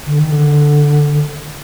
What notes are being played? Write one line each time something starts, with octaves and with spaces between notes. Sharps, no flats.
D3
D#3
D3